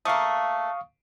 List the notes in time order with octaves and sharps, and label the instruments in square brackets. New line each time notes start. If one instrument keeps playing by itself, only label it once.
[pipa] A3 A#3 [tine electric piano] F5 C#6 D#6